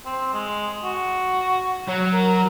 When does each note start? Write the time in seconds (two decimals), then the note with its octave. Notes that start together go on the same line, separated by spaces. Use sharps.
0.05 C4
0.34 G#3
0.84 F#4
1.88 F#3
2.13 A#4